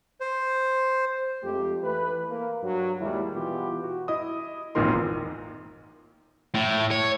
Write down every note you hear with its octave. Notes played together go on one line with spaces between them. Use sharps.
C5
F2 G#3 A3 G4
E3 A3 B4
A#3
G2 F#3
D#2 G3 G#3 E4
B2 E3 B3 F4 G4
F#4
E4 D#5 D#6
G#1 E2 A#2 D#4 A#4 C6
A2
C#5